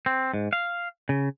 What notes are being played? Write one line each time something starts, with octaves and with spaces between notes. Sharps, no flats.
C4
G#2
F5
C#3